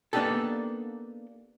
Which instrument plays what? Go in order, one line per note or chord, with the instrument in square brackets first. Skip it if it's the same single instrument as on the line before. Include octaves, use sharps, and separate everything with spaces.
[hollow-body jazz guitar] A#3 B3 D4 D#4 G4 A4